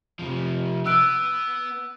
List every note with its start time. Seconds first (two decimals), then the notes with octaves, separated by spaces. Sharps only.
0.19 C3 F3
0.86 B3 E6 F#6 D7